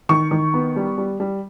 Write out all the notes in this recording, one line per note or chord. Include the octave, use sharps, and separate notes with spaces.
D#3 C#6
D#3
B3
G3
G3
G3